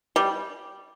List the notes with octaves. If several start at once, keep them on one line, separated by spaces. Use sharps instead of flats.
G3